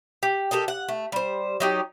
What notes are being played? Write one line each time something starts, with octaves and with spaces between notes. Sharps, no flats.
G4
G4 A4 A#4 D#5
F#5
A3
G3 C5
F#3 D#4 G4